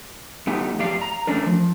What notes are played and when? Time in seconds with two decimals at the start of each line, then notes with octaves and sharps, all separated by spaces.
0.47 G3 A3 B3 D#4 G4
0.79 F2 G4 D5 F5
1.01 A#5
1.27 A3 C#4 D4 A#4
1.46 F3